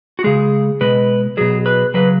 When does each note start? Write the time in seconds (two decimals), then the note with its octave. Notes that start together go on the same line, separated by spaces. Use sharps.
0.19 F#4
0.24 C#3 G#3 G#4
0.81 B2 G#3 B4
1.37 B2 F#3 G#4
1.66 B4
1.94 C#3 F#3 B4